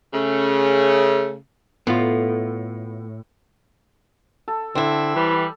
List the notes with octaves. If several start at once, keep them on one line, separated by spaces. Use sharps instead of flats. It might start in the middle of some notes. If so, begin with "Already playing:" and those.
C#3 A3
A2 B3 F4
A4
D3 C4 E4
E3 G3